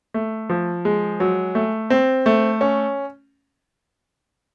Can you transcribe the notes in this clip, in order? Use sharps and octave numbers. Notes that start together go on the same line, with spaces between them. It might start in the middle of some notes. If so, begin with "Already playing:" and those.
A3
F3
G#3
F#3
A3
C4
A3
C#4